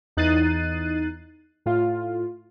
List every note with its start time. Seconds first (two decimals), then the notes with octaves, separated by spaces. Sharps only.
0.17 E2 D#4 F#6 A6 C7 D#7
1.66 A2 F4